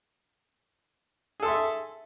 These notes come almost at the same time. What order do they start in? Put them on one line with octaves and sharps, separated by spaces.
G#4 A4 C6 E5